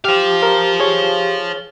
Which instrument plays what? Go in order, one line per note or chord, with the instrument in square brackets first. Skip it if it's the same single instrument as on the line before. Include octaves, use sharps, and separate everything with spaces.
[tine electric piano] G4 [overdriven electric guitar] C5 F5
[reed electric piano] A#4
G#4 C#5